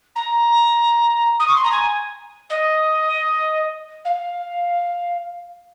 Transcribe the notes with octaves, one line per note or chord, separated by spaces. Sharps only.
A#5
D#6
C#6
C6
A#5
G#5
D#5
F5